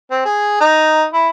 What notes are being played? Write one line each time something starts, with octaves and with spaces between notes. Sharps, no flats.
C4
G#4
D#4
E4